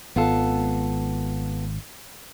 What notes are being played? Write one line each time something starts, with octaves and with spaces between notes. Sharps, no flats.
G#1 B3 F4 A4